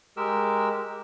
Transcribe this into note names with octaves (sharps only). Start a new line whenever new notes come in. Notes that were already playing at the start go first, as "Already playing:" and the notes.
G#3 G4 A#4 E6